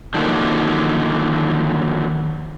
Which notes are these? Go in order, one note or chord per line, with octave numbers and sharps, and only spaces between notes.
D3 D#3 F3 F#3 A#3